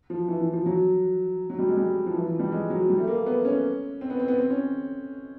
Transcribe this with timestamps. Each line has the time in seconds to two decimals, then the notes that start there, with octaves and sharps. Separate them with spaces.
0.10 F3
0.28 E3
0.41 E3
0.53 F3
0.66 F#3
1.50 F#3
1.59 G3
1.68 G#3
1.77 G3
2.06 F3
2.14 E3
2.27 F3
2.39 G3
2.52 G#3
2.70 F#3
2.89 G3
2.98 A3
3.08 A#3
3.26 B3
3.45 C#4
4.01 C4
4.10 B3
4.20 C4
4.28 B3
4.38 C4
4.50 C#4